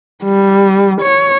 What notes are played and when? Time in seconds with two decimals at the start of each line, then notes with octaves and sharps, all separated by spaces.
0.24 G3
1.01 C#5